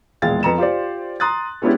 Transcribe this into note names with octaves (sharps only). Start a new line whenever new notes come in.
E1 A#1 G#3 F5 A6
F2 B4 A#5 C#7 E7
F4 G4 C5 D5
A#5 C6 D#6 F#6 A6
G#3 B3 C#4 D4 E4 G4